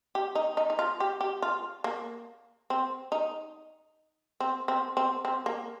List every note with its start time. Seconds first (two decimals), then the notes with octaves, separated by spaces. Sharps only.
0.15 G4
0.35 D#4
0.57 D#4
0.70 D#4
0.79 F4
1.00 G4
1.21 G4
1.42 F4
1.84 A#3
2.70 C4
3.12 D#4
4.40 C4
4.68 C4
4.97 C4
5.25 C4
5.46 A#3